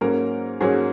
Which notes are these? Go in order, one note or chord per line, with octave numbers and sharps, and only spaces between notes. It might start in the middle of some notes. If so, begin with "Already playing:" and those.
G#2 F#3 A#3 C#4 A#4
G#2 F#3 A#3 C#4 G#4